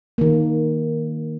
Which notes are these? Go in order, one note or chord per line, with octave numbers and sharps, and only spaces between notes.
D#3 A#3